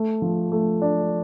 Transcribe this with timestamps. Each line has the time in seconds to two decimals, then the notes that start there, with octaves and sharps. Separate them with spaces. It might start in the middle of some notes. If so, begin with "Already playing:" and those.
Already playing: A3
0.22 F3
0.52 A3
0.82 D4